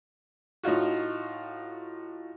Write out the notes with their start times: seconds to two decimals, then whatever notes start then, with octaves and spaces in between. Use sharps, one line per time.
0.63 A2 D#4 F4 F#4